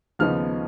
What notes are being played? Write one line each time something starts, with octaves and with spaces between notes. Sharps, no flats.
D#2 C#3 F3 B3 D#4 F6